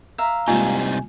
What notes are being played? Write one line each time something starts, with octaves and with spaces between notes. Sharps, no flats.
E5 F5 A#5
C3 G3 G#3 A#3 D#4 F4 G#5